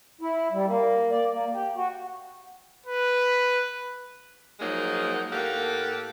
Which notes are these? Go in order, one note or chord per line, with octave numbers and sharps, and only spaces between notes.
E4
G3
A#3
D5
A#3
G4
F#4
B4
F3 F#3 G#3 A#3 D#4
A2 A#3 G4 A4 F#5